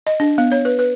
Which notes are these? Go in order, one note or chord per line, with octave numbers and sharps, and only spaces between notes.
D#5
D4
B3
C#5
B4
B4